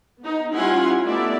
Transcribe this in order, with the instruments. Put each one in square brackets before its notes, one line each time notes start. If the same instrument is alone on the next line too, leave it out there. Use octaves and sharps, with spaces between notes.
[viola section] B3 D#4
G3 C#4 E4 F4 F#5 G#5
A3 B3 D#4 E4 D5 E5